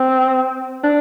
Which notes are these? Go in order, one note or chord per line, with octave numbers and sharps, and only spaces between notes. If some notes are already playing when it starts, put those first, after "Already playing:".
Already playing: C4
D4